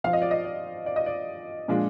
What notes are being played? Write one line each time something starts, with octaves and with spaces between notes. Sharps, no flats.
F3 C4 F4 F5
D#5
D5
D#5
D5
D5
D#5
D5
A#2 F3 G#3 D4 F4